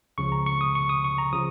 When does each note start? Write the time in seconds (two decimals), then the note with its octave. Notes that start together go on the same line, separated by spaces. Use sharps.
0.18 C#2 C#3 F3 C#6
0.32 A#5
0.46 C#6
0.61 D#6
0.75 C#6
0.89 D#6
1.04 C#6
1.18 A#5
1.33 C#3 F3 D#6